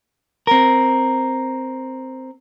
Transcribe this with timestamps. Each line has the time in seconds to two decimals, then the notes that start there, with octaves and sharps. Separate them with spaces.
0.47 C4 A#4